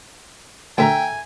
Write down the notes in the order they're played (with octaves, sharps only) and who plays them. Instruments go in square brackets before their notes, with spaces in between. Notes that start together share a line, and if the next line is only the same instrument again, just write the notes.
[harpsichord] D2 A#4 [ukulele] A4 E5 A#5 [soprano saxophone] G5 [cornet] G#5